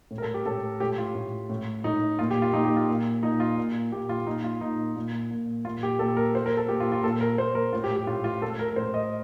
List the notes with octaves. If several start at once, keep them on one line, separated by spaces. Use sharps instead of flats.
A2
A#4
A4
G4
A2 A4
A2 G4
F4
A2
A2
A2 D#4
A#2 F4
G4
F4
A#2 D#4
G4
F4
A#2
A#2 D#4
F4
A#2
A#2 G4
F4
A#2 D#4
F4
A#2 D#4
A#2
A#2
A#2 F4
G4
A#2 A4
A#4
A#2 C5
A#4
A4
A#2 G4
F4
F4
A#2 A4
A#4
A#2 C5
A#4
A2 F4
G4
G4
A2 F4
F4
A2 A4
A#4
A#4
A2 C5
D#5